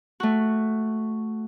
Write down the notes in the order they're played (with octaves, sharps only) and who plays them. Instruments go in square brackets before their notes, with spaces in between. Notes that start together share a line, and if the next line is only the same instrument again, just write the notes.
[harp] A3 F#4